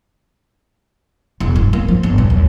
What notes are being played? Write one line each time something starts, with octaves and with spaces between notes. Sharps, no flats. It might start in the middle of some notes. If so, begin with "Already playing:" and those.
E1
G2
A#3
F3
G1
A#2
D#2